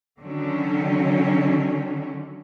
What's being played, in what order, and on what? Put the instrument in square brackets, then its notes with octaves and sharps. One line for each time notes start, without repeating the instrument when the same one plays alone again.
[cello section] D3 D#3 F#3 C#4